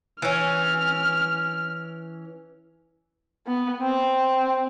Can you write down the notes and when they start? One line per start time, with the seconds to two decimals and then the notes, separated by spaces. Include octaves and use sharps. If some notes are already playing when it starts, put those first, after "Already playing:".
0.22 E3 C#4 F6
3.46 B3
3.82 C4